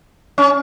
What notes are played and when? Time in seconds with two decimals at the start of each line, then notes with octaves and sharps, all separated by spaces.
0.38 C#4